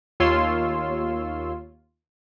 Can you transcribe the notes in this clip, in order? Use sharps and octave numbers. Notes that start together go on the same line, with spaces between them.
D#2 F4 C#5 C6 E6